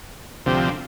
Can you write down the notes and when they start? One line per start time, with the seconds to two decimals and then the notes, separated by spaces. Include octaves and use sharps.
0.46 D2 C3 F3 C4 G4